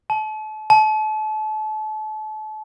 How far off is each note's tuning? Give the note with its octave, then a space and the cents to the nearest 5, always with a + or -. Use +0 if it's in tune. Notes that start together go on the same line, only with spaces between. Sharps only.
A5 -35
A5 -35